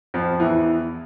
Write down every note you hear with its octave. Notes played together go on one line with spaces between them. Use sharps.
F2 F3
E2 E3